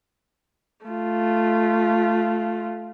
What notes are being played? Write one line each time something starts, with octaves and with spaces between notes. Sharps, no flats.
A3 F4